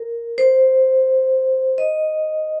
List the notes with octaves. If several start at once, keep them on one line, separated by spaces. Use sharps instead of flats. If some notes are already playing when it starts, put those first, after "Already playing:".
Already playing: A#4
C5
D#5